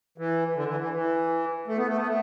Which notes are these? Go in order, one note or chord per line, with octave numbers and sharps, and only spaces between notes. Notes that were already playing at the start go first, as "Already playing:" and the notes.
E3
D3
E3
E3
E3
A3
B3
A3
B3
A3